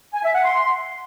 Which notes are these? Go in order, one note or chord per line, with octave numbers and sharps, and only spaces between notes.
G#5
E5
F#5
C6